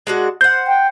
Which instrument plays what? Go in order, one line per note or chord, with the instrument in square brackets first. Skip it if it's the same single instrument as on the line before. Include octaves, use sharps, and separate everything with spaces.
[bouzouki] G#3 D4 F#4
[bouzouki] C5 F#5 [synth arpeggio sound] G6
[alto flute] G5